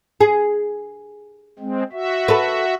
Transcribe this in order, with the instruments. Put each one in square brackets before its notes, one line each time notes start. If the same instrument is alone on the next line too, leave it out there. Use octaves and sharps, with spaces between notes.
[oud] G#4
[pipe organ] G#3 C4
F#4 E5
[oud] A4 B4